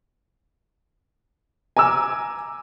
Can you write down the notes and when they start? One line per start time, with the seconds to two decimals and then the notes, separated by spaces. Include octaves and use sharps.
1.77 G#5 A#5 D6 E6